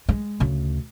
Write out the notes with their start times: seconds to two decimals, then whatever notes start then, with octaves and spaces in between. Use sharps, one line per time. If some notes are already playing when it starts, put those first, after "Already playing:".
0.09 G#3
0.40 D2 C#3